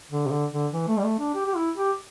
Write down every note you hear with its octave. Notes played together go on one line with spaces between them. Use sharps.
D3
C3
D3
D3
E3
A3
G3
A3
D4
G4
G4
E4
G4